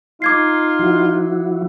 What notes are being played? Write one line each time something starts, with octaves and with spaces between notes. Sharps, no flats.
D#4 F4 D6 G#6 C7
F3 E4 F#4